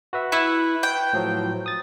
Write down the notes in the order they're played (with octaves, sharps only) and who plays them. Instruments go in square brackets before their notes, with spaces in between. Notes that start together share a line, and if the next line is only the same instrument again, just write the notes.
[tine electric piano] F#4 B4 E5
[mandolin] E4 [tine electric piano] B4 C#6
[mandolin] G5
[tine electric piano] A2 F3 F#3
D#6 A6